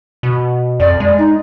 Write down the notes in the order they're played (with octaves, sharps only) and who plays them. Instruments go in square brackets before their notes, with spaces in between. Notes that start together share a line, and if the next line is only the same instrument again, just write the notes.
[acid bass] B2
[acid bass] F2 [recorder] D5
[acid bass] G#3
[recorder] D#4